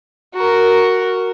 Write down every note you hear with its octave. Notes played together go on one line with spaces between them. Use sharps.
F#4 A#4